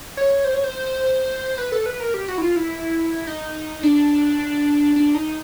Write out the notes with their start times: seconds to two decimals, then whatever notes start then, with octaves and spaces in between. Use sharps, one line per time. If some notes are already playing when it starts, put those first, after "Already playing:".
0.17 C#5
0.45 C5
0.54 C#5
0.64 C5
1.58 B4
1.72 A4
1.86 B4
2.00 A#4
2.14 G4
2.28 F#4
2.38 E4
2.42 F4
2.56 E4
3.27 D#4
3.83 D4
4.96 D4
5.15 D#4